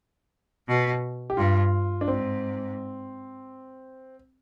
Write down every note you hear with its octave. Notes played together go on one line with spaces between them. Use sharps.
B2
G4
G2 F4
D4
G#2 C4